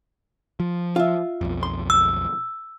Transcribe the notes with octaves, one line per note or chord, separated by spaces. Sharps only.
F3
F4 E5
B1 F2
C6
E6